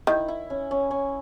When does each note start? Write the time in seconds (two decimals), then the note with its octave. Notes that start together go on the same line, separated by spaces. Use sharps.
0.07 D#3 E4
0.28 E4
0.50 C#4
0.71 C#4
0.91 C#4